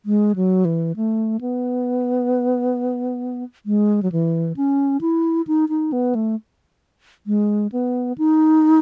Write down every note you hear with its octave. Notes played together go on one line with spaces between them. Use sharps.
G#3
F#3
E3
A3
B3
G#3
F#3
E3
C#4
E4
D#4
D#4
B3
A3
G#3
B3
D#4